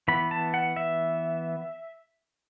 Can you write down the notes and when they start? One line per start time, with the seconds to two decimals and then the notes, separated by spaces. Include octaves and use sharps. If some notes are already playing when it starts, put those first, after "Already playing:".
0.08 E3 B3 B5
0.31 A5
0.54 F#5
0.76 E5